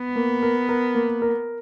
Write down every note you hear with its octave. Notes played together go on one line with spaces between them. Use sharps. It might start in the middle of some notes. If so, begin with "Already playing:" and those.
Already playing: B3
A#3
A#4
A#4
A#3
A#4